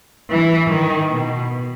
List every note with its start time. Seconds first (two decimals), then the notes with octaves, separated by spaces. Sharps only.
0.30 E3
0.70 D#3
1.12 B2